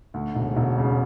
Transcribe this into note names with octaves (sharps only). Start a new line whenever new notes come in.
D2
E1
E1
C#3